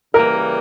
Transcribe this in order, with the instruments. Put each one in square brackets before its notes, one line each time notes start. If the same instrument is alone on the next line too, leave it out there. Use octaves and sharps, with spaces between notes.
[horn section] C#3 E3 G3 A#3 [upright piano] A#4